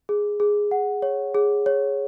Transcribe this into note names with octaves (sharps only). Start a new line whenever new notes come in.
G#4
G#4
F#5
C#5
G#4
C#5